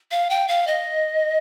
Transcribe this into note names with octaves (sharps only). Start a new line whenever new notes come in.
F5
G5
F5
D#5